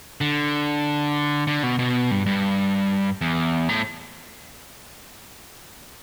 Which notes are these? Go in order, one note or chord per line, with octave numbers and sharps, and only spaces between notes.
D3
D3
B2
B2
G2
G2
E2
A2